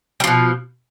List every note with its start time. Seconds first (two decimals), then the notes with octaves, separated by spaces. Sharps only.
0.20 G3
0.24 F3
0.27 B2